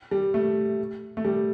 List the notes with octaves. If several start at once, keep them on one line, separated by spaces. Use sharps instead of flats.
G3
A3
A3
G3